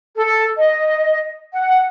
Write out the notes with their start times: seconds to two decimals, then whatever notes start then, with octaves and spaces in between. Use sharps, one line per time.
0.16 A4
0.57 D#5
1.54 F#5